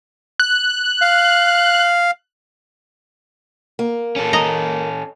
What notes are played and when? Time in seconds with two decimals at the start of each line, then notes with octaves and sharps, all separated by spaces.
0.40 F#6
1.01 F5
3.79 A#3
4.16 C#4 A4
4.33 D#5 A#5